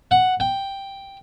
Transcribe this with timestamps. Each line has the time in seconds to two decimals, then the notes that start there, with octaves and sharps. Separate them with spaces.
0.11 F#5
0.40 G5